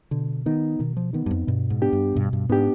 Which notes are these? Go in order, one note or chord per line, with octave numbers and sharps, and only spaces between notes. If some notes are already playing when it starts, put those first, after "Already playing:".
B2 D3
D#3 B3 D#4
B2 D#3
F3
D#3 B3 D#4
G2
F2
G2 B2
G#2
B3 D4 G4
G2
G2 B2
G2
G#2 B3 D4 G4